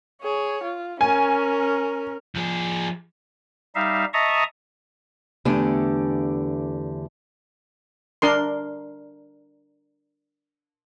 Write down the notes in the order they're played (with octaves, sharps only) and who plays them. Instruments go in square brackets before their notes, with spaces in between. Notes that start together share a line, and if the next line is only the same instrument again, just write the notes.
[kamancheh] G#4 C#5
F4
[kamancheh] C#4 A#4 [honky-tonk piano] G#5
[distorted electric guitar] F3 G#4
[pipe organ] G3 D#4 E5 F5
D#5 E5 A5 A#5 C#6 D#6
[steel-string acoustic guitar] E2 D3 A3 G4 G#5
[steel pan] D4 A#4 C6